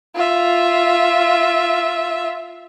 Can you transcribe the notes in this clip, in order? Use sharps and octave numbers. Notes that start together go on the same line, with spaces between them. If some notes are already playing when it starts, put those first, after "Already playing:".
F4 E5